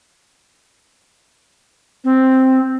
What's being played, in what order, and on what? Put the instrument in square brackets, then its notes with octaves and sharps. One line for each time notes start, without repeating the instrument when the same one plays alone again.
[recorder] C4